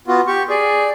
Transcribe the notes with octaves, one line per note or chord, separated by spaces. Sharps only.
B3 F4 F#4
G4 C#6
G#4 D5